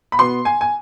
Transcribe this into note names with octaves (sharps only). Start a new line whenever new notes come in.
B5
B2 B3 C6
G#5
G#5